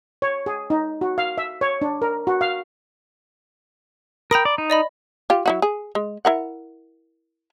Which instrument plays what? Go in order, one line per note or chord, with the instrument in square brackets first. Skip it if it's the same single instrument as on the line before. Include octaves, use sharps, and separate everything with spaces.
[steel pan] C#5
G#4
D#4
F#4
F5
E5
C#5
D4
A#4
F#4
F5
[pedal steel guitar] A#4 G5 [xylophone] A#5 B5 D#6
[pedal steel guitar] D5
D#4
[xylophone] D5 D#5 B5
[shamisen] F4 G4
F#3 E4 F#4
G#4
G#3
E4 A#4 F#5